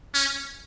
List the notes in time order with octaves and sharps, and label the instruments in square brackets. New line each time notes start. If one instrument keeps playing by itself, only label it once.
[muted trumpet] C#4